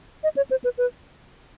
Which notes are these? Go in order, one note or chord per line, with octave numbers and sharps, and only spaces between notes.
D#5
C#5
C5
B4
B4